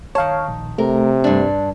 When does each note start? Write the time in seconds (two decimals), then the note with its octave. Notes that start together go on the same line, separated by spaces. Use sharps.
0.15 D#3 C#5 F5 A5
0.48 A#1
0.78 C3 A3 A#4
1.24 G2 D4